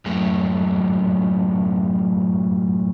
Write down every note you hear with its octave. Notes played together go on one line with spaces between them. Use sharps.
F#2 A2